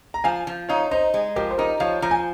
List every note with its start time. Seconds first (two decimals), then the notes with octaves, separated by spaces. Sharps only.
0.14 A#5
0.24 F3 F5 G#5
0.47 F3
0.69 D#4 C#5 F5
0.91 D#4 C5 D#5
1.14 G#3
1.36 F3 G4 A#4
1.51 C5
1.58 D#4 G4 A#4
1.80 F3 C#5 F5
2.02 F3 A#5
2.11 G#5